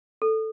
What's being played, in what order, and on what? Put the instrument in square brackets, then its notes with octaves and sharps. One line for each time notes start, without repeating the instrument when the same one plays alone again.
[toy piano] A4